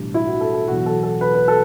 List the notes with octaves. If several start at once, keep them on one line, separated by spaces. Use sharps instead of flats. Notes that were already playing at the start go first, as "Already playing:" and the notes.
Already playing: B1 A2 E3 G3 D4
E4
F#4
A4
A4
E1 E2 B2 F#3 F#4
A4
A4
B4
B4
A4